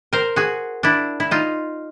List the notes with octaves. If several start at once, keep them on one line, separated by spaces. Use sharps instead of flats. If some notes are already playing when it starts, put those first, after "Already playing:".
A#4 C5
F#4 G#4
D4 E4
E4
D#4 F4